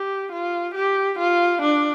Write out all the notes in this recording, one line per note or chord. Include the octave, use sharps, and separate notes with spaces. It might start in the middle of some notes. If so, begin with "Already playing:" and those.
Already playing: G4
F4
G4
F4
D4